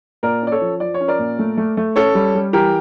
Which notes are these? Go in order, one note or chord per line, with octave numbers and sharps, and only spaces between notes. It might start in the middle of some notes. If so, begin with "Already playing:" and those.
A#2 A#4 D5
C#4 D5
A4 C#5
F3
F3 D5
C#5
C#4
A#4 D5
A#2
A3
A3
A3
C#4 A4 C#5
G3
G3
E3 G4 A#4